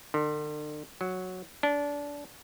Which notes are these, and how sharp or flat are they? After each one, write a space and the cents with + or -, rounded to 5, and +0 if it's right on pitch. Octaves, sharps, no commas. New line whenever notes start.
D3 +45
F#3 -5
D4 -25